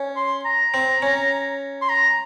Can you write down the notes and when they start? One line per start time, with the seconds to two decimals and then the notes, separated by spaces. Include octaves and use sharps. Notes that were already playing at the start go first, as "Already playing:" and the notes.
Already playing: C#4
0.16 C6
0.46 A#5
0.74 C4
1.02 C#4
1.81 C6
1.89 A#5